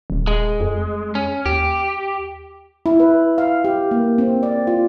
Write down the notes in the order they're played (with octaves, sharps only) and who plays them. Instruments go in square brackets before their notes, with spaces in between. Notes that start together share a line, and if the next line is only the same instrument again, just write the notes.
[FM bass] D#1
[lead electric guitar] G#3
[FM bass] F2
[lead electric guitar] C#4
[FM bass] D#2 [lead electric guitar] G4
[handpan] E4
B4
F5
G4
A#3
C4
D5
F4